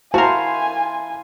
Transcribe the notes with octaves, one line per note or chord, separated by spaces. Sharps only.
E4 F#4 A#4 C5 F5 G#5 A5